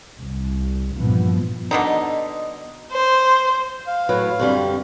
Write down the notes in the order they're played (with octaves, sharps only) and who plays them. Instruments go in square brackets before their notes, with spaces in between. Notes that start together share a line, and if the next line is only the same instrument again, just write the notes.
[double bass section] C2
G2 A#2 E3 F3 B3
[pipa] B2 D3 D#4
[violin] C5
[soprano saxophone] F5
[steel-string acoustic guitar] A2 F#3 [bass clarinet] B4
[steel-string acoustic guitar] F#2 D3 G3 [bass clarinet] C4